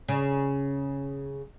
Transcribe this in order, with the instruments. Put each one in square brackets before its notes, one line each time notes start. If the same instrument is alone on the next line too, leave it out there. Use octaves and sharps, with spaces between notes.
[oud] C#3